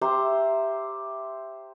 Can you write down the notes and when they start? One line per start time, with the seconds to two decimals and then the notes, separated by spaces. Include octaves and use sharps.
0.01 G4 C5 E5 A#5